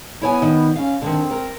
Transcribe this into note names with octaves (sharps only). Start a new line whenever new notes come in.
B3 E4 C#5 G#5
D#3
C#4 F5
D3 D#3 C4
A#4